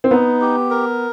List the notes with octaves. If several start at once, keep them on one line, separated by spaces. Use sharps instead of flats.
C4
B3 D#4
G4
A#4